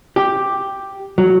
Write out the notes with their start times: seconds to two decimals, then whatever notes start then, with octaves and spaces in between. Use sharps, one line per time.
0.16 G4
1.18 F#3